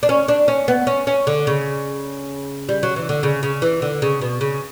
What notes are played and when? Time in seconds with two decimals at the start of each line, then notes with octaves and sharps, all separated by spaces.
0.03 D4
0.09 C#4
0.28 D4
0.48 C#4
0.68 B3
0.87 C#4
1.07 C#4
1.27 D3
1.47 C#3
2.69 G3
2.83 F#3
2.96 E3
3.09 D3
3.23 C#3
3.43 C#3
3.62 E3
3.82 D3
4.02 C#3
4.21 B2
4.41 C#3